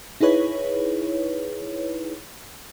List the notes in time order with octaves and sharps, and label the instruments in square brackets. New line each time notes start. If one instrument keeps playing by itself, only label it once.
[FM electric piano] D#4 E4 G#4 B4 C#5